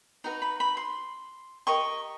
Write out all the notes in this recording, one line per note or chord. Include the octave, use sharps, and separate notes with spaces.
D#4 F#4 B4 A#5
B5
B5
C6
G4 A#4 D#5 C#6